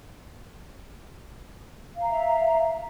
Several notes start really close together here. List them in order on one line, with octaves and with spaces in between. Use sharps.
F5 A#5 E5